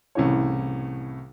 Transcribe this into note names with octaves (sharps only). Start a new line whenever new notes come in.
C2 A2 C#3 E3 C#5